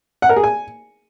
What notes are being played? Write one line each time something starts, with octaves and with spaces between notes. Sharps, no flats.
F#5
A#4
G#4
G#5